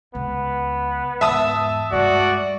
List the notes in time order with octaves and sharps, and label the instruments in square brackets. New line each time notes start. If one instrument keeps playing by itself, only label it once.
[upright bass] C#2 [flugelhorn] B3
[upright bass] E2 G#2 [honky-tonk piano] E5 A5 D#6
[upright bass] G2 G#3 [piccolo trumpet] F#4 [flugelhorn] D5